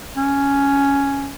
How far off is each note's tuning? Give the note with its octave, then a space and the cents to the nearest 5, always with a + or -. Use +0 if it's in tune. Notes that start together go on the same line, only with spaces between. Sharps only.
C#4 +5